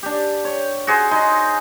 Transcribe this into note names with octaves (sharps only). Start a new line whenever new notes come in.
D4 G4
C#5
F#4 G#4 C5
D#4 G#4 C6